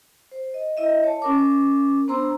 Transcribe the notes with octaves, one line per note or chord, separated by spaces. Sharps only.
C5
D#5
E4 D#5 E5
C#5 A5
C#4 A#4 D6
B3 D4 C5 A#5 C6 E6